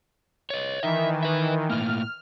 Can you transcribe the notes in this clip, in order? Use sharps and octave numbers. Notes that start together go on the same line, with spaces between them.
C#5 D#5
D#3 E3 E5
B4 E5
A2 A#3 F6